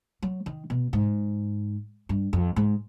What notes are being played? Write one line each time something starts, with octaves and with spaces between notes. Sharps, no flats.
F#3
D#3
B2
G#2
G2
F2
G#2